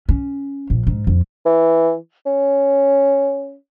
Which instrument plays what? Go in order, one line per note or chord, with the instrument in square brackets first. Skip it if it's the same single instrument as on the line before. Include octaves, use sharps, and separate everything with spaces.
[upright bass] C#4
A#1
G#2
F2
[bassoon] E3
C#4